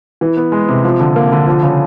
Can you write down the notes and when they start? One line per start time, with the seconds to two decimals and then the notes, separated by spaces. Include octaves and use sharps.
0.21 E3
0.37 B3
0.52 G#3
0.69 C3
0.84 F3
1.00 D3
1.16 A#3
1.32 D3
1.47 F3
1.63 C#3